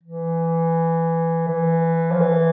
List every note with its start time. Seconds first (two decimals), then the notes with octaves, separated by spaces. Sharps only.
0.04 E3
1.48 E3
2.12 F3
2.21 E3